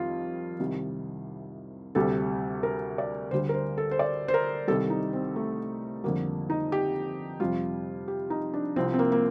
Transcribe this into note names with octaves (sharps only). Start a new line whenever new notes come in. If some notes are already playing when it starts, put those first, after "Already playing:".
Already playing: F2 D#3 G3 F4
C2 C3 D#3 G3
D2 C3 G3 A4
A#4
D5
D2 D3 G3 C5
A#4
C5
A4
C5
D5
C5
A#4
C2 C3 D#3 G3 A4
D#4
C4
A3
F2 D3 G3 A#3
D#4
G4
F2 C3 G3 F4
G4
D#4
D4
C2 C3 F3 C4
C4
A#3
A#3